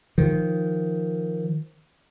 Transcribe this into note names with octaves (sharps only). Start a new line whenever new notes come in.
D#3 F3